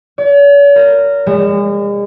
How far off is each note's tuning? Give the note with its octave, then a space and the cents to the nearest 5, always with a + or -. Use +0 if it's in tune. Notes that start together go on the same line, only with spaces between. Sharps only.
C#5 +45
A#4 -15
G#3 -40